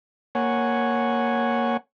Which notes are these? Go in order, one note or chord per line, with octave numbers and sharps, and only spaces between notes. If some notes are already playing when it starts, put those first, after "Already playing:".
A#3 C#5 F#5 G#5